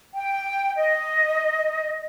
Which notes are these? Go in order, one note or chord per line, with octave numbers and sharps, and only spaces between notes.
G5
D#5